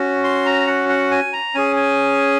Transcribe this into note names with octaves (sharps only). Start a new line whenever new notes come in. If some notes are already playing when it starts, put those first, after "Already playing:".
Already playing: C#4 F#4
C6
A#5
F#5
F#5
G#5
A#5
C#4 G#4 G#5
G#5